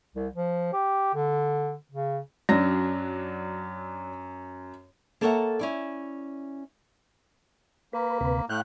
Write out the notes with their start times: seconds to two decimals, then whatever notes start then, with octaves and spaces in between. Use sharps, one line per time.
0.15 C2
0.34 F3
0.73 G4
1.14 D3
1.92 C#3
2.49 F#2 F#3 C#4 D4 A#6
5.21 A#3 A4 A#4 C#5 E5 F#5
5.59 C#4 E4 D5
7.93 A#3 B4
8.21 D2 C3 B4
8.49 A2 F5 G5 F#6